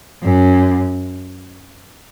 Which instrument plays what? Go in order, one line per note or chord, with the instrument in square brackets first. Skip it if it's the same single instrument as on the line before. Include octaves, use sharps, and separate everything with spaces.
[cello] F#2